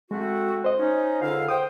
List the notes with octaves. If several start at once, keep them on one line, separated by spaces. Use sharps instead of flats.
G#3 A3 C4 F#4
C5 D#5
C#4 D#4
C#2 D3 F5
C5 G5 D#6